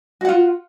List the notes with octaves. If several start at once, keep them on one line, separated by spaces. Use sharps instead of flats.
F4 F#4 F#5